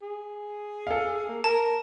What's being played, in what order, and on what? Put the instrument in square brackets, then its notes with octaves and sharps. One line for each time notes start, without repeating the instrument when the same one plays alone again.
[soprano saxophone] G#4
[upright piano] A4 F5
[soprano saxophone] A#3
[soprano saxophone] A#4 [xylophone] A5